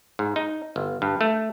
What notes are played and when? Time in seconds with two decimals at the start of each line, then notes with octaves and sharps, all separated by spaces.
0.19 G#2
0.36 D#4
0.76 G1
1.02 G2
1.21 A3